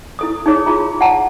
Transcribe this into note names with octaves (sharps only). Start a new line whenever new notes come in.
E4 A4 D#6
D#4 G#4 C#5
F4 G#4 A#5
F#5 A5 A#5